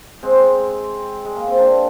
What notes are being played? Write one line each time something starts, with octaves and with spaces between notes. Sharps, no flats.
G#3 C4
G#3
A#3
C4
A#3 D4